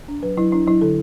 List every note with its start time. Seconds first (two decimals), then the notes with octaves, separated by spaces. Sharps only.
0.08 D4
0.23 F#3 B4
0.37 F#3 E4
0.52 D4 E4
0.66 F#3 E4
0.81 D3 A4